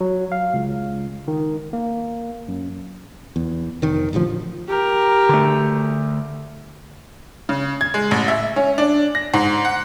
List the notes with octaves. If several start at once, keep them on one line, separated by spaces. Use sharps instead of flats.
F#3
F5
C#2
D#3
A#3
F#2
E2
F1 D#3
D1 A1 D2 F3
G4 A#4
D3 A3
C#3
G#6
G#3
A1
E5
C#4
D4
A#6
G#2
F#5